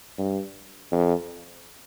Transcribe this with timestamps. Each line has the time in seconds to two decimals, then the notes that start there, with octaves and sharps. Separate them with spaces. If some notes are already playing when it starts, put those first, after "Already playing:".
0.18 G2
0.92 F2